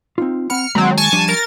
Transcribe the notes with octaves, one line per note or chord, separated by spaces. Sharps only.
C4 D#4 F4
C4 F#5 B5 F6 C#7
D#3 F#3 G#3 A#3 C4
G#5 A5 C#6
F3 G3 D4
A#4 A6